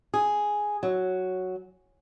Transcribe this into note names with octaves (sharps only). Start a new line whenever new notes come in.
G#4
F#3